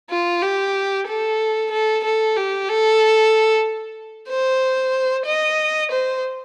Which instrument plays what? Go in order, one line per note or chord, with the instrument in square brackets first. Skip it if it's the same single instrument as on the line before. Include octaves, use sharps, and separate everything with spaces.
[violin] F4
G4
A4
A4
A4
G4
A4
C5
D#5
C5